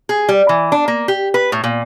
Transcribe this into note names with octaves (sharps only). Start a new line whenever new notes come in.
G#4
G3
E3
D4
A#3
G4
B4
A2
A#2